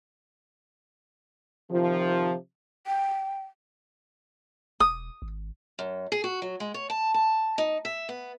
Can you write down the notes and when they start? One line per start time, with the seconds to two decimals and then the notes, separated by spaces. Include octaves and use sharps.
1.70 C3 D#3 F3
2.87 G5
4.80 E1 D#6
5.22 G#1
5.79 F#2
6.12 G#4
6.24 F#4
6.42 F#3
6.60 G#3
6.74 C#5
6.90 A5
7.14 A5
7.58 D#4
7.85 E5
8.09 B3